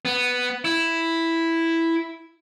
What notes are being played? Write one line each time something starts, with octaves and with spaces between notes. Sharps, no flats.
B3
E4